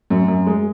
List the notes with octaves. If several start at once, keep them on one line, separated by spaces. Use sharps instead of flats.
F#2
F#2
G#3